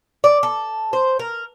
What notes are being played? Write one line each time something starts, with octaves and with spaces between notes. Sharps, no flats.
D5
A4
C5
A#4